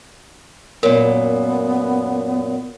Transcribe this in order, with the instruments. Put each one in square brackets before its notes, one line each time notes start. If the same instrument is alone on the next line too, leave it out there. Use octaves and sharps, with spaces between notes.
[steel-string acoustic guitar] F#2 A#2 [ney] B3 [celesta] A#4